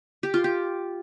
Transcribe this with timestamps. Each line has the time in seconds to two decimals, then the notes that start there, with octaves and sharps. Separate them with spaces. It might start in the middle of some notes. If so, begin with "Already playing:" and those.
0.23 G4
0.34 F4
0.44 G4